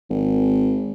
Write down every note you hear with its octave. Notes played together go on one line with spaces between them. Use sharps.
G#1